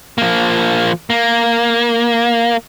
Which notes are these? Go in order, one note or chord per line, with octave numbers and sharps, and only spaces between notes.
F3 A#3
A#3